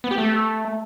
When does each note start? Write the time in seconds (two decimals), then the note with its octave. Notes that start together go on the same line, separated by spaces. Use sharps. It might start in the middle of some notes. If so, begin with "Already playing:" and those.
0.04 B3
0.11 G4
0.18 A3